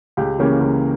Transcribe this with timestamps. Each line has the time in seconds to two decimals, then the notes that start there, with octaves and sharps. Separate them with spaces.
0.17 C#2 G4
0.39 C#3 E3 A#3 C#4 G4 A#4
0.61 C#2